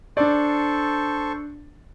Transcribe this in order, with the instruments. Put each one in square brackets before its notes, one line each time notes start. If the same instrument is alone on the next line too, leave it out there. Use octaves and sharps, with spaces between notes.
[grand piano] D4 D5 [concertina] A4 C5 C#6